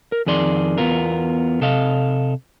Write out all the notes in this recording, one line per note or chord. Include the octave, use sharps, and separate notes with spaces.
A#4
F2 D#3 G#4 D5 C6
E2 G2 B3 F4 A#4
C3 A4 D#5 F5